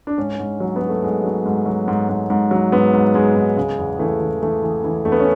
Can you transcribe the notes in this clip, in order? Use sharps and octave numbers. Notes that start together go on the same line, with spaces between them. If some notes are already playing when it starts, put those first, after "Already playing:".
D4
G#2 C#4
G#2
F#3
B3
F#3
A3
G#2 G#3
F#3
G#2
F#3
G#2
G#2
G#2
F#3
G#2 B3
G#2
G#2 G#3
G#2
C#3 G#3
E2
E3 A3
E3
E3 A3
E3
E3
E2 A3
B3
C#4